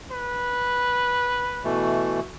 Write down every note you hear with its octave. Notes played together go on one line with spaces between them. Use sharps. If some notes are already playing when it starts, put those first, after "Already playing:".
B4
B2 E3 A3